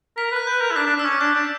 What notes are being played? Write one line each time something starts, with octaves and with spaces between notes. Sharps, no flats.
A#4 B6
B4 F#6
B4 G6
A#4
E4
D4 B6
D4
D4
E6
C#4 D6
D4 G6
D4